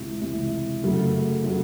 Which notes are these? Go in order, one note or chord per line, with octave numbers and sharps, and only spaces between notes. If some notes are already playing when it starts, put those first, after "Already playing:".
Already playing: C#2 C3 E3
C#2 C3 E3
F#2 C#3 F#3 A3
C#3 F#3 A3